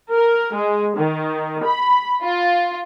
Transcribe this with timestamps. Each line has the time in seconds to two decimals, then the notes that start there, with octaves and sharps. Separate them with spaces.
0.12 A#4
0.56 G#3
0.97 D#3
1.64 B5
2.23 F4